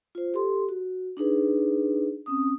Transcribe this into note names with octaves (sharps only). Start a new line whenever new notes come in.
F4 C5
G4 A4 C6
F#4
D4 D#4 G#4 B4
C4 C#4 D#6